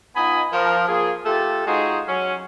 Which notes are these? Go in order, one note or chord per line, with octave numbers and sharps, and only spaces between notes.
B3 D#4 F4 D#5 G#5 B5
F3 A#4
F3 A#3 F4 G#4
A3 F4 G4 A4
G#3 D#4 F4 F#4 G#4 C5
F#3 C#4